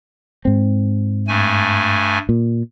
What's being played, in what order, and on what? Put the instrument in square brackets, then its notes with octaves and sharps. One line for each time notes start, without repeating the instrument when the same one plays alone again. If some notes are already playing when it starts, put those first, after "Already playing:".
[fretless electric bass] G#2 C4
[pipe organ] G2 A3 G#5
[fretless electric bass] A#2